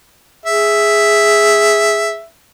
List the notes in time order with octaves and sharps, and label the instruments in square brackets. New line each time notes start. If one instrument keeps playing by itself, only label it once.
[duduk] G#4 [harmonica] E5